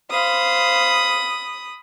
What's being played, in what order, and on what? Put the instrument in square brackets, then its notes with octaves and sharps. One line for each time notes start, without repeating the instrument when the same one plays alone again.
[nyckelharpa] C5 F5 [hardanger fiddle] B5 D#6